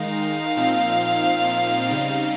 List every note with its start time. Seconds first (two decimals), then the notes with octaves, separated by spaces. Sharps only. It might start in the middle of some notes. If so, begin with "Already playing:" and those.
Already playing: D#3 G#3 D#4 F5
0.57 A#2 F3 C4 D#4
1.89 C#3 G3 C4 D#4